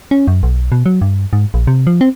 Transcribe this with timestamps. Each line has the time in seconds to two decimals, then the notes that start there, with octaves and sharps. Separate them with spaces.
0.11 C#4
0.28 F#2
0.43 B1
0.72 B2
0.86 F#3
1.01 G2
1.33 G#2
1.54 A#1
1.67 C3
1.87 F3
2.01 C4